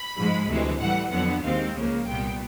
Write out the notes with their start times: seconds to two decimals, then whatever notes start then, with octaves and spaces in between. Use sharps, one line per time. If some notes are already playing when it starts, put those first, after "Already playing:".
Already playing: B5
0.17 G#2 F3 G#3
0.48 D2 C3 E3 G#3
0.79 A2 E3 G3 F#5
1.11 F2 D3 F#3 B3 F#5
1.43 D#2 D#3 G#3 C4 F5
1.75 C#2 C#3 F3 A#3
2.06 C2 A#2 G3 B3 G5